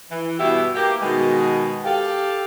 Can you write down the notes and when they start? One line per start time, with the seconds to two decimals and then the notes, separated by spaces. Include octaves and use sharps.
0.10 E3
0.38 G2 B2 B3 E4 G4 E5
0.74 A#3 G4
1.01 B2 D#3 G#3
1.84 G4 A4 F5